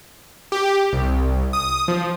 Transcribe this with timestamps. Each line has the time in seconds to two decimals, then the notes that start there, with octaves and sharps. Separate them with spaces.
0.52 G4
0.93 C2
1.53 D#6
1.88 F3